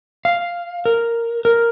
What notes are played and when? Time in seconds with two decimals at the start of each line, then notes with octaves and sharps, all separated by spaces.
0.25 F5
0.85 A#4
1.45 A#4